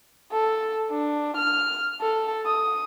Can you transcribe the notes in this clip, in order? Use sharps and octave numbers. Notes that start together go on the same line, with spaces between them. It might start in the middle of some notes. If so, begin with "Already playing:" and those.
A4
D4
F6
A4
D#6